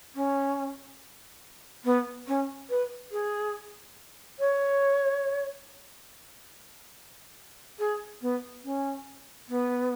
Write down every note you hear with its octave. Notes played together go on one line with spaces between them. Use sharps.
C#4
B3
C#4
B4
G#4
C#5
G#4
B3
C#4
B3